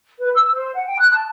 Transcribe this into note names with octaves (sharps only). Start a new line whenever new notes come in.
B4
E6
C5
F#5
G5
F#6
A5